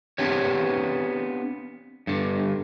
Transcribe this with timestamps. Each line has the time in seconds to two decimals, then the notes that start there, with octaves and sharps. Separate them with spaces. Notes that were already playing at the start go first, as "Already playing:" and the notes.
0.18 B3 C4 D4 F4 G4 C#5
2.07 G2 D3